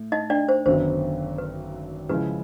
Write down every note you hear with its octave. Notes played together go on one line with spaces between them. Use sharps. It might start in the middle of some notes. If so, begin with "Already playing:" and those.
Already playing: A2
D#4 D#5
D4 D5
C5
G#1 F#2 D3 F#3 B3 C5
B4
C#3 F3 G#3 C#4 E4 B4